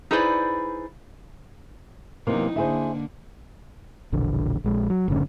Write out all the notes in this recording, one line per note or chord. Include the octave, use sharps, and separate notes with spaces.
D#4 E4 G#4 B4 C5 D5
C3 E3 F#3 A#3 B3 D#4
D3 A#3 E4 G#4 C5
E1 A#1 D3
A#1 G#3
F#3
F#1 A2 D3 C#4